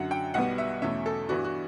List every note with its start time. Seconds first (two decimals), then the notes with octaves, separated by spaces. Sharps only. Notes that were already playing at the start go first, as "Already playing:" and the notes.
Already playing: F#2 D3 F#3 F#5
0.11 G5
0.34 B1 B2 G3 B3 F#5
0.58 E5
0.82 E2 B2 A3 C#4 E5
1.06 A4
1.29 G2 E3 B3 D4 F#4
1.44 F#4